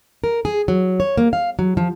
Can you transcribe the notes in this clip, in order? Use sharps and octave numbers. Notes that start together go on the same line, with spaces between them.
A#4
G#4
F#3
C#5
A#3
F5
F#3
F3